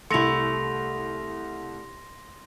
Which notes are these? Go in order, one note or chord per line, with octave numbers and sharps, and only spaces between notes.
C2 A3 E4 C6 A#6 C#7 F7